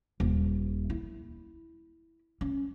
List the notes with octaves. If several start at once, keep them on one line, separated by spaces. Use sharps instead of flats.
D#1
E4
C#4